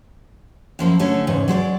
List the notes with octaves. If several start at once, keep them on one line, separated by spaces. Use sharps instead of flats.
F#2 F3 A#3 E4
D3 A3 C#4
E2 G#2 C#3
F#3 G#3 C5 D5